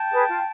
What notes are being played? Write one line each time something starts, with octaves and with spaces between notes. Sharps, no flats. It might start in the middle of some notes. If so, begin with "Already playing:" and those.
Already playing: G5 A5
G#4 B4
F4